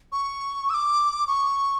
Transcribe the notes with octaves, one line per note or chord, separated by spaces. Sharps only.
C#6
E6
D6
C#6